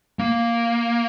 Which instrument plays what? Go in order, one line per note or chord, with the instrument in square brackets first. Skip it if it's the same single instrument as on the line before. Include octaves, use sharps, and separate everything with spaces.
[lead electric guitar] A#3